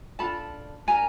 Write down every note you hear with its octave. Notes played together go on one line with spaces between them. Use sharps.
D4 F4 A4 A5 B5
D4 G4 A#4 G#5 A#5